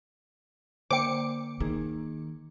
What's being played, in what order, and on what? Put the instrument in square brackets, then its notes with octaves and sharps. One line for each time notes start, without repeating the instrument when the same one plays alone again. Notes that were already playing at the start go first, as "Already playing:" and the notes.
[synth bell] D3 A#3 [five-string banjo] C5 G5 [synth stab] D6 C#7
[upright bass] D#3 [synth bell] A#3 G#4